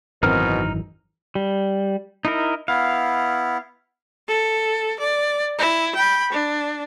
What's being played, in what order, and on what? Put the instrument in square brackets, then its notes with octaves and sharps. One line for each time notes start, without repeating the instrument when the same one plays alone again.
[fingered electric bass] G#1 F#2 E3 [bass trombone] B2 [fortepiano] C4 A#4 [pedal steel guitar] D#4 F6
[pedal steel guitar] G3
D#4 E4 A#4
[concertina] B3 E4 [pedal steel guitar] F5
[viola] A4
D5
E4
G5 B5
D4